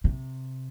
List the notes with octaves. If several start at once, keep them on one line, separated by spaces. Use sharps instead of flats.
C3